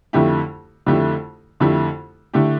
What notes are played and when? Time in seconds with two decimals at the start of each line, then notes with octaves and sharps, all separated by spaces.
0.13 F2 D3 A3 E4 G4
0.86 F2 D3 A3 E4 G4
1.60 F2 D3 A3 E4 G4
2.34 D3 A3 E4 G4